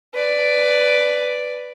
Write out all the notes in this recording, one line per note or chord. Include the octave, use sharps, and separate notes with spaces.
B4 D5